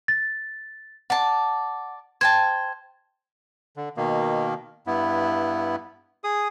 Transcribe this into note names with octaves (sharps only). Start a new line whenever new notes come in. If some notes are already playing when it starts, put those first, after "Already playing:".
A6
D5 F#5 A5
C5 G5 A5 G#6
D3
B2 D#3 A#3
G2 B3 E4
G#4 D#6